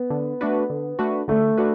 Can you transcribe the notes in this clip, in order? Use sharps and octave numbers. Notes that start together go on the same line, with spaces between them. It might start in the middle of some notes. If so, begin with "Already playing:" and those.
Already playing: B3
D3
A3 D4 F#4 B4
D3
A3 D4 F#4 B4
D3 A3
D4 F#4 B4